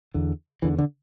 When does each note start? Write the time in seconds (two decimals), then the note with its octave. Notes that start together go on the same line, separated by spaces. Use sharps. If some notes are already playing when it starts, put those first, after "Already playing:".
0.14 E2 D3
0.62 E2 D3 E3
0.79 D3